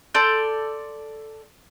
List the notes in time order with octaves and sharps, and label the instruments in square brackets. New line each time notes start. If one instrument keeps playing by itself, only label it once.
[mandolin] A4 D5 C6 G6